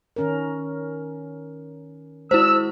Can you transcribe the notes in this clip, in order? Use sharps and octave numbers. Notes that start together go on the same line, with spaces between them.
D#3 C#4 A#4
G#3 E4 F#4 C5 E6